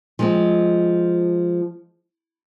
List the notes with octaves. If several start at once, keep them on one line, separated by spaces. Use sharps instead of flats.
F3 G#3 C4